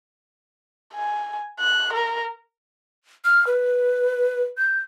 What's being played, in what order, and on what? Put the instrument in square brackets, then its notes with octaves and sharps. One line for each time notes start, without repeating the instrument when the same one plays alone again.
[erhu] G#5
F#6
A#4
[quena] F6
B4
G6